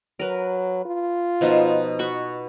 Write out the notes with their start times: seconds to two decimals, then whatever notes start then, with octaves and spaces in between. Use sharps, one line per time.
0.20 F#3 A#4 B4
0.86 F4
1.41 B2 F3 D#4
1.99 F#4 B5 C#6